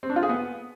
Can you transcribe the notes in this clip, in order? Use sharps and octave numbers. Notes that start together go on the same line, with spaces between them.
C4
D4
F4
G#4
B3